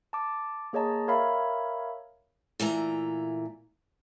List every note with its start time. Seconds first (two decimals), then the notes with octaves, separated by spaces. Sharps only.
0.13 A5 D6
0.73 A#3 G#4 C#5 D#5 A5 A#5
1.08 A#4 C#5 E5 F5 A#5 B5
2.60 A#2 E3 A3 A#5